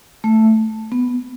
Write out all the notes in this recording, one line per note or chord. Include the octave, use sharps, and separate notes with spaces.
A3
B3